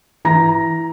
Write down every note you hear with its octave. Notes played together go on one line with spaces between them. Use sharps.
E3 A#5 A#6